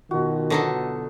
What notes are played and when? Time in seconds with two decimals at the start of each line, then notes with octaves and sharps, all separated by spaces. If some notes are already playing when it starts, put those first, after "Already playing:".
0.11 B2 D#3 F4 F#4
0.50 D3 F#3 B3 D#4 A4